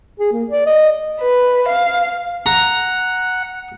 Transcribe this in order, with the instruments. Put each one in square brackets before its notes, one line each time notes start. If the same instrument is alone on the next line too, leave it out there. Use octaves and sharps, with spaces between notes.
[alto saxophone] G#4
A#3
D5
D#5
[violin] B4
F5
[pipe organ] F#5 [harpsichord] A#5